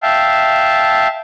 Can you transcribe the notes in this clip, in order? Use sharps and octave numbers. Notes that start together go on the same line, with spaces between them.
E5 F5 G5 A5